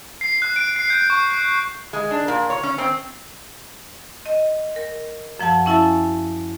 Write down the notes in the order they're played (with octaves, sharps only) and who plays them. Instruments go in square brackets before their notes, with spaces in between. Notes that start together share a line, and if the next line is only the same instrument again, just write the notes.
[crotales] C7
F#6
D7
C7
G6
C#6
F#6
[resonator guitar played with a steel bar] G#3
D4
A#2
C#5
C#4
C4
[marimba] D#5
A#4
F#2 F3 F#5 A5
C#4 E4 E5 G#5 A5 A6